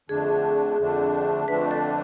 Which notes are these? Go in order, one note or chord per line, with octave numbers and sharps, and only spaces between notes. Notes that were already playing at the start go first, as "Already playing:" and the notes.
F2 D3 A3 D4 G#4
F2 D3 A3 D4
F2 D3 A3 D4 B4
A4